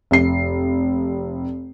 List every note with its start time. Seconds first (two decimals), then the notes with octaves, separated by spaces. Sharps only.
0.11 F1 C7